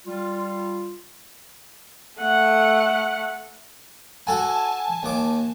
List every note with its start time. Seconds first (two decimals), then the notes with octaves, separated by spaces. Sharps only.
0.06 G3 F4
2.21 A3 F#5
4.27 F#4 A4 F#5 G#5 A5
5.03 D#2 D6